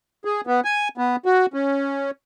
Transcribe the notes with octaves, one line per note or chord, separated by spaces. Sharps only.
G#4
B3
G#5
B3
F#4
C#4